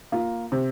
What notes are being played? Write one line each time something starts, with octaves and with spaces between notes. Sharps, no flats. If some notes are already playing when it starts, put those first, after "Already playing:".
A#3 F4
C3